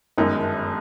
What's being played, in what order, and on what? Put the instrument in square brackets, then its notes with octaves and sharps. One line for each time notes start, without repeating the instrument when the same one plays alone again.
[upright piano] G1 F#2 D#3 G#3 D#4